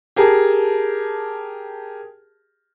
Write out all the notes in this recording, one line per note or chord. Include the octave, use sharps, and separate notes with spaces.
G4 G#4 A#4 A5